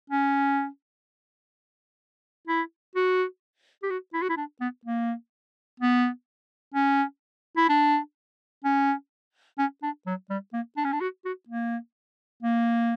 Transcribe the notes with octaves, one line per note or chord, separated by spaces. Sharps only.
C#4
E4
F#4
G4
F#4
E4
F#4
E4
D4
B3
A#3
B3
C#4
E4
D4
C#4
C#4
D4
F#3
G3
A#3
D4
C#4
D4
F#4
F#4
A#3
A#3